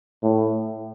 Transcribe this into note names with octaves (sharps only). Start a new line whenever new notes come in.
A2